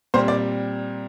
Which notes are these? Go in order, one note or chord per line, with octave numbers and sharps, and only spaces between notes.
A#2 G3 C4 C5
D5